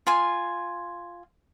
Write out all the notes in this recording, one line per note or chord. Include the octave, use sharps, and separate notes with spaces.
F4 G#5 C6